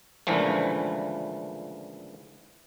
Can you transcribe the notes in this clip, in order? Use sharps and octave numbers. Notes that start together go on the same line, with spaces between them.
C#2 A#2 D3 E3 F3 A3